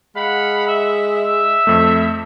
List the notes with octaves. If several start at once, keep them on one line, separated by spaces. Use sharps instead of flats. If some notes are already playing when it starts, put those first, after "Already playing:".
G#3 F5 F#5 B5
E5
E5
F2 A3